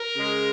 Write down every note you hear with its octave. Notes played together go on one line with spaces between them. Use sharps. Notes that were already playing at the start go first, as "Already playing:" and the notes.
Already playing: A#4
C#3 G#3